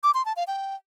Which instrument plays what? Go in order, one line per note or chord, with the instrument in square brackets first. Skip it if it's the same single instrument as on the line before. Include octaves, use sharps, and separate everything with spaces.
[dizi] D6
C6
A5
F5
G5